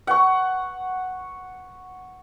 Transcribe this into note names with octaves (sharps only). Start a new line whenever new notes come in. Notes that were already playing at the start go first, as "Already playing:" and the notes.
F#5 C#6